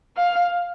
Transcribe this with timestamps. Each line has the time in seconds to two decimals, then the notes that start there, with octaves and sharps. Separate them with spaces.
0.17 F5